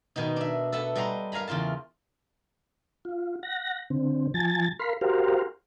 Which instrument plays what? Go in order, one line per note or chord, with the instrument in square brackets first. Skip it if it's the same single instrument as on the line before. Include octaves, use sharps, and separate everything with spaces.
[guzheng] B2 D#3 B3 D#4
D4 E5
A4 B4 E5 F#5 A5
G3 D#5 F#5 A#5 C6
A#4 F5 G#5 A#5 B5
E2 C#3 F4 F5 A5
[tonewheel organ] F4
F#5 A#6
D3 C4
F3 G#5 A5 A6
A#4 F5 B5 C6
F#4 G4 A#4 C5 F5